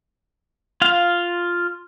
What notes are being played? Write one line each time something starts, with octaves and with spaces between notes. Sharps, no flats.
F4 F5